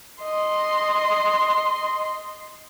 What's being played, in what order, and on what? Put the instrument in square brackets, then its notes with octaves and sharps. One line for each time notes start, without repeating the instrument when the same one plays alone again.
[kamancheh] D#5 C6